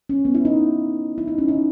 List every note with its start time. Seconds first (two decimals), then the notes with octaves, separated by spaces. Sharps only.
0.09 C#4
0.25 B3
0.35 E4
0.45 D#4
1.18 E4
1.28 D#4
1.38 C#4
1.48 D#4